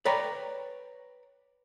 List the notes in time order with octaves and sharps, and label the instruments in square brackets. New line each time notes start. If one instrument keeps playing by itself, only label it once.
[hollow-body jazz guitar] B4 C#5 D5 G5 A#5 B5